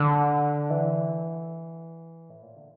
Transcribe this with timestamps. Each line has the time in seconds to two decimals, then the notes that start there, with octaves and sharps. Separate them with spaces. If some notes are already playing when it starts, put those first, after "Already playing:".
Already playing: D3
0.70 E3
2.30 A2
2.42 A#2
2.56 D3